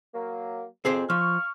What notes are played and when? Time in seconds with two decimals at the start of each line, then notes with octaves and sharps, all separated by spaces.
0.15 F#3 A#3
0.85 F2 C4 G#4 C5
1.10 F3 F5 C#6 F6